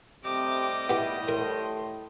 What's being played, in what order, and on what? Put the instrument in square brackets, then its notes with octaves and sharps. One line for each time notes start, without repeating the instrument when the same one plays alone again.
[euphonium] C3 [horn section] G3 A3 D#5 [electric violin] D6
[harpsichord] B3 G4 [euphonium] E4
[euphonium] A2 [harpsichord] A#4 [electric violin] C6